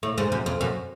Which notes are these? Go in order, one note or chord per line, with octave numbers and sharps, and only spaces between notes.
A2
G#2
F#2
F2
F#2